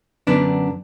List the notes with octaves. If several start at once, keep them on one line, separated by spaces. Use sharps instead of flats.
F#2 D3 B3 D4